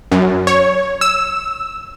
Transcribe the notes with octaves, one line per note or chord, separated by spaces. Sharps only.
F#2
C#5
E6